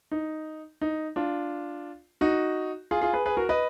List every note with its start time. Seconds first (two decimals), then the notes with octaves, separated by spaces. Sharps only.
0.11 D#4
0.81 D#4
1.16 D4 F4
2.21 D#4 F#4
2.91 F4 G#4
3.02 F4 G#4
3.13 G#4 B4
3.26 G#4 B4
3.37 F#4 A#4
3.49 B4 D#5